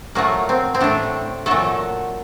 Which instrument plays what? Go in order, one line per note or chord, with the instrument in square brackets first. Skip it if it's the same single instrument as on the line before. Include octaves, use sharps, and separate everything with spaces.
[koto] A#2 F#3 A3 A#3
C4
C4
A2 A3 D4
A#2 F#3 A3 A4